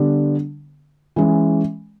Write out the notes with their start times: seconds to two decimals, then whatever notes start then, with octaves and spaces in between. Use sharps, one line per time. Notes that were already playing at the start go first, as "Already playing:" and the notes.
Already playing: D3 G3 B3 D4
1.16 E3 G#3 C#4